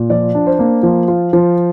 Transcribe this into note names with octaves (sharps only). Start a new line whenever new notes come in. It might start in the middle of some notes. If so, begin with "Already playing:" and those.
Already playing: A#2
F3 D5
D4
C5
A#3
F3
F4
F3